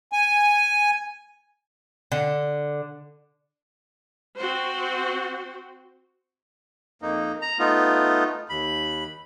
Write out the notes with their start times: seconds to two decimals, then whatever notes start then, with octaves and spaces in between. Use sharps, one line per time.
0.12 G#5
2.12 D3
4.38 C4 F#4 C5
7.02 F2 A#3 D#4
7.42 A#5
7.59 A3 B3 D#4 F4
8.49 D#2 B5